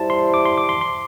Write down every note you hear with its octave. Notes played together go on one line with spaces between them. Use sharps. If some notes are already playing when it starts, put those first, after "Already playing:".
Already playing: G3 E4 C5 A5
C6
D6
C6
D6
C6
C6